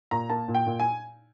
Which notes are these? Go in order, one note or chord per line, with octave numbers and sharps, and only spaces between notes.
A#2 A#5
A#3 A5
A#2
G5
A#2
G#5